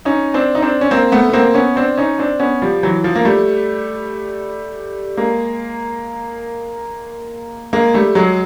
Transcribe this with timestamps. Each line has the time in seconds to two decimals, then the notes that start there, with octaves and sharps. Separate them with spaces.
0.05 C#4 D#4
0.34 C4 D4
0.55 D#4
0.62 C4 D4
0.81 C#4
0.91 A#3 C4
1.12 A3 B3
1.29 B3
1.33 A#3 C4
1.54 B3 C#4
1.76 C4 D4
1.98 C#4 D#4
2.19 C4 D4
2.40 B3 C#4
2.62 F3 G3
2.83 E3 F#3
3.04 F3
3.15 A#3
3.25 G3 A3
5.17 G#3 A#3
7.73 G#3 A#3
7.94 G3 A3
8.15 F#3 G#3